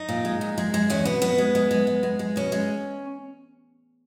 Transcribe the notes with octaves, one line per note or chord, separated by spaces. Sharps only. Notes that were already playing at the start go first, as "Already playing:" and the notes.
Already playing: D#4
A#2
G#3
A#2
G#3
G#3
E2 C#4
B2 B3
B2 B3
G#3
G#3
G#3
G#3
G#3
G#3
B2 C#4
G#3